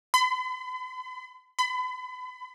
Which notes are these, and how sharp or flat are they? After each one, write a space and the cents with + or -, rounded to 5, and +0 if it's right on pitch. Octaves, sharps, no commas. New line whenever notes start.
B5 +45
B5 +35